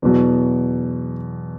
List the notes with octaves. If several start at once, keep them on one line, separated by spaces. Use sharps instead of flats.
E2 B2 F#3